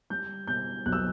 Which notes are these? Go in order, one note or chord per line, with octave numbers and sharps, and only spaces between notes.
G3 G6
B2 G6
B1 F#6
E6